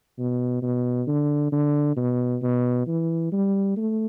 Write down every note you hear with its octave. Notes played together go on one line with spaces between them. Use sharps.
B2
B2
D3
D3
B2
B2
E3
G3
A3